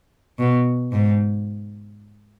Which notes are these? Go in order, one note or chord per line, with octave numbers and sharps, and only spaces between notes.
B2
G#2